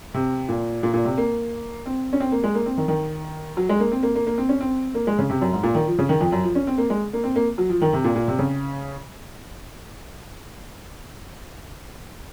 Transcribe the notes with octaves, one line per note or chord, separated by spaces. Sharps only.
C3
A#2
A#2
A#2
C3
A#3
C4
C#4
C4
A#3
G#3
A#3
C4
D#3
D#3
F#3
G#3
A#3
C4
A#3
A#3
A#3
C4
C#4
C4
A#3
G#3
C#3
C3
F#2
G#2
A#2
D#3
F3
C#3
D#3
F2
F#2
F3
C#4
C4
A#3
G#3
A#3
C4
A#3
F#3
F3
D#3
C3
A#2
A#2
C3
C#3